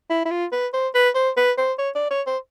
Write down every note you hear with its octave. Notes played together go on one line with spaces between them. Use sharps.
E4
E4
F4
B4
C5
B4
C5
B4
C5
C#5
D5
C#5
C5